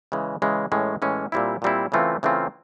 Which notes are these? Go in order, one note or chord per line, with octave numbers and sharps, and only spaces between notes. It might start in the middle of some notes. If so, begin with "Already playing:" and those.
C#3 E3 G#3
C#3 E3 G#3
A2 E3 G#3 C#4
A2 E3 G#3 C#4
A#2 G3 C4 E4
A#2 G3 C4 E4
C#3 E3 A3 C4 F4
C#3 E3 A3 C4 F4